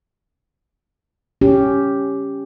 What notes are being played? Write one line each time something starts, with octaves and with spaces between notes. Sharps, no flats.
C#4 G4